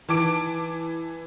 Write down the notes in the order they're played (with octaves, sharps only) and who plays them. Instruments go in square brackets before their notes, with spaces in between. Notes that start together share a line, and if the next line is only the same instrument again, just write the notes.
[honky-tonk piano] E3 A5 D6 D7